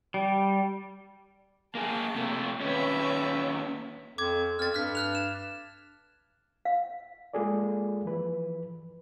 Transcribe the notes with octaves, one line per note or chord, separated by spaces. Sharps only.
G3
A#3 G#4 A5
C3 A3
D#2 C#4 B4 E5
F2 D6 G#6
F2 F6 A6
G2 F6 F#6 B6
F6 F#6 F7
E7
F5
G#3 A#3 F4 G#4 A4 D5
E3 F3 B4